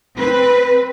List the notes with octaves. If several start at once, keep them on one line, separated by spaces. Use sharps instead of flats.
C4 B4